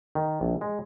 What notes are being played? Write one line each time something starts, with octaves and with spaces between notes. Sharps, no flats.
D#3
A#1
G#3